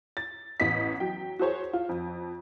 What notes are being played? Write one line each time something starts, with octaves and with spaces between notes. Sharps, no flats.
A6
A1 B3 D#5 B6
F#3 G5
F#4 G#4 C5 C#5
F4
F2